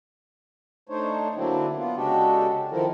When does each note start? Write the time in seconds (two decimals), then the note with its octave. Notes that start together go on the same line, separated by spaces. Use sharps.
0.89 A3 D4 D#4 C5 C#5
1.36 D3 F#3 A#3 C4 D4 E4
1.77 B3 F4
1.96 C#3 G#3 D4 F#4 G4 A4
2.71 D#3 F3 C4 E4 A4 A#4